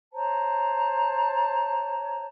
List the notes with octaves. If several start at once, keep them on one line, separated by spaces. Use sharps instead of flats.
C5 C#5 A5 A#5